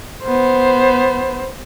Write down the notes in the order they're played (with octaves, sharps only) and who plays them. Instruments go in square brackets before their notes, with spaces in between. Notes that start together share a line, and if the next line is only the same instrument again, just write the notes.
[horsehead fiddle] B3 C5